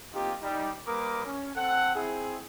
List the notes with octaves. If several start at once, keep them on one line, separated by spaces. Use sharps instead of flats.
A#3 C4 D#4 F4 G4
G3 D#4
G3 A#3 A#4 B4 D6 D#6
C#4
C4 A4 F#5
C4 E4 G#4